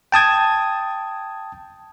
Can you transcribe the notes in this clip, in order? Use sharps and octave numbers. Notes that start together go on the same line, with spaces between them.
G5 A5 D#6 G#6